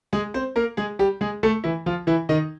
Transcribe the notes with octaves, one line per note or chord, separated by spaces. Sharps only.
G#3 G#4
C4 C5
A#3 A#4
G#3 G#4
G3 G4
G#3 G#4
A3 A4
E3 E4
F3 F4
E3 E4
D#3 D#4